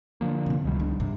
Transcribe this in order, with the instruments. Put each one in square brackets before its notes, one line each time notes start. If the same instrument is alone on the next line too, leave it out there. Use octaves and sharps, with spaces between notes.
[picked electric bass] D3 F3 A#3
[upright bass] E2 C3
[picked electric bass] C#2 D#3 G3
[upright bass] D4
[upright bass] G2 [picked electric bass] C3